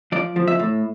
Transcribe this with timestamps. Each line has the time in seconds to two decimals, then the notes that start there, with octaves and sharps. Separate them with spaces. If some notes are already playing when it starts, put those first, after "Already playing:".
0.12 F3 D5
0.36 F3
0.47 E5
0.59 A2